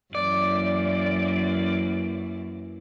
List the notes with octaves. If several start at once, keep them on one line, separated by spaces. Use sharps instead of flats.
F#2 E3 A#3 D5